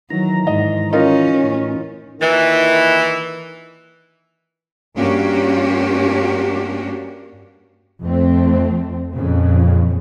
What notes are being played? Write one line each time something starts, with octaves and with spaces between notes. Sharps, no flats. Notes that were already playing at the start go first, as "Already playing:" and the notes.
D#3 E3 F#3 A#5
G#2 D#5
C#4 D#4 F4 A#4
A2 E3
A#2 D#3 E3
G2 A#3 C#4 D4 F#4 G4
F2 A3 C4
F2 A#2 C#3